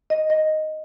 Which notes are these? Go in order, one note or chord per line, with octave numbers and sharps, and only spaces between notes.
D#5
D#5